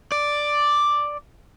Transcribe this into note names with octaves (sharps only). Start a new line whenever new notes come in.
D5